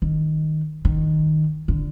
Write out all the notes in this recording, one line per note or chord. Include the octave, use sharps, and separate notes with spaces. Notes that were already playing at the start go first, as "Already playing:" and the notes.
D#3
D#3
D3